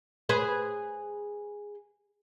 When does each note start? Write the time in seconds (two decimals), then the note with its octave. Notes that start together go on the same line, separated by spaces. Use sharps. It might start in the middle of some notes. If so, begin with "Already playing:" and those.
0.29 G#4 B4 C5